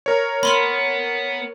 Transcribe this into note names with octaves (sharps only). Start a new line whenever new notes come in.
A#4 C#5
B3 B5 C6 F6